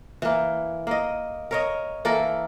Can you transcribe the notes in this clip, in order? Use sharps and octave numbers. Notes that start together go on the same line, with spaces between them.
E3 A#3
A#3 D#5
A#4 C#5 D#5
E3 A#3 A4 A#4